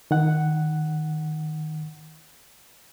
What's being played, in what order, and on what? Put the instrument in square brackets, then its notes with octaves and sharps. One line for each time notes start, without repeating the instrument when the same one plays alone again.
[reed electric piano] D#3 F#5